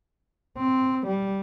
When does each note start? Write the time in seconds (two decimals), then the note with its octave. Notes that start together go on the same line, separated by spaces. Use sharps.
0.57 C4
1.07 G3